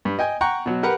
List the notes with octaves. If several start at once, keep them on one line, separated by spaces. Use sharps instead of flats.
G2
D#5 G5 G#5
F#5 G5 A#5 C#6
B2 F#3
G4 A#4 B4 F#5